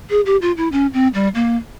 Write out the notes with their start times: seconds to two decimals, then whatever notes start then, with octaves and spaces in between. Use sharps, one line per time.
0.10 G#4
0.26 G4
0.41 F4
0.57 E4
0.72 C#4
0.94 C4
1.14 G3
1.35 A#3